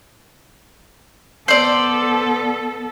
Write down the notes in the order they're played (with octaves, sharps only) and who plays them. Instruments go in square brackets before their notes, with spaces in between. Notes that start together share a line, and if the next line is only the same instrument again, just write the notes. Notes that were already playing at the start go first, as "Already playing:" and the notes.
[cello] B3 A4 [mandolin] C5 D5